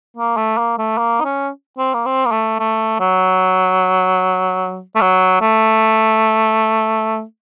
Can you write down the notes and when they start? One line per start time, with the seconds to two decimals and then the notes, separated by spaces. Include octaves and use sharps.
0.17 A#3
0.37 A3
0.58 A#3
0.78 A3
0.98 A#3
1.20 D#4
1.25 C#4
1.78 C4
1.94 A#3
2.06 C4
2.25 A#3
2.32 A3
2.60 A3
3.00 F#3
4.95 A3
5.01 F#3
5.41 A3